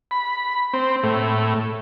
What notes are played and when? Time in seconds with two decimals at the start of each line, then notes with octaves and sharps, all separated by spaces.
0.11 B5
0.73 C4
1.03 A2